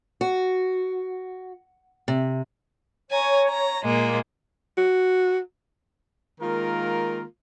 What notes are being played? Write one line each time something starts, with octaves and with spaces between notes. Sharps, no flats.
F#4
C3
C#5 G#5 A#5
A#5
A#2 G#3 A#3
F#4
D#3 G#3 A#3 F4 A#4